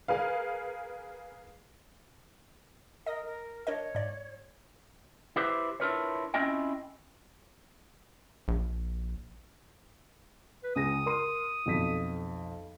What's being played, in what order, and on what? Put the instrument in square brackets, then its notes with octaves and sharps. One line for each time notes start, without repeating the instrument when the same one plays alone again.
[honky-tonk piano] G#4 A#4 B4 F5
[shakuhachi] A#4 [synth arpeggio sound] D#5 D#6
[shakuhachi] A#4
[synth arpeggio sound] D4 A#4 D#5 [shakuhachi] C#5
[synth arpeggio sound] G#2 D5
[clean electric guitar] E4 G4 B4 C5
D4 E4 F4 A#4 B4 C#5
C4 C#4 E4 F4 D#5 G5
[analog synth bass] A#1
[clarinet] B4
[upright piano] C#2 G#4 A#6 [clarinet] D#6
[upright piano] A#4 C6 D#7
B1 F2 B6